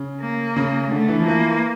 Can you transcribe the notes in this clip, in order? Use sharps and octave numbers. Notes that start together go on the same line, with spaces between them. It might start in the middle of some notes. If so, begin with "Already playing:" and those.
Already playing: C#3
A#3
C#3
D3 A3
E3
F3
E3 A#3